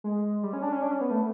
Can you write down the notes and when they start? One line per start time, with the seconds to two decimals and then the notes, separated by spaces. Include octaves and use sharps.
0.04 G#3
0.43 G3
0.53 C#4
0.62 D4
0.72 C#4
0.82 D4
0.91 C#4
1.01 B3
1.11 A3